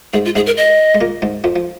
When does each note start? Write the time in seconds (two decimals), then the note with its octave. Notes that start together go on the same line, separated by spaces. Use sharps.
0.13 G#2 G#3 G#4
0.25 F4
0.35 G#2 G#3 G#4
0.46 A#4
0.57 D#5
0.95 G#3
1.01 A#2 A#3
1.22 G#2 G#3
1.44 F2 F3
1.56 F3